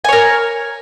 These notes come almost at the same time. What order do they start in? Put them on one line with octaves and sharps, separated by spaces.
G#5 C#5 A#4